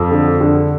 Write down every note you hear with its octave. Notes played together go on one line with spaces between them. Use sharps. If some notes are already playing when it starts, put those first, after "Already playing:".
Already playing: F2
D3
D3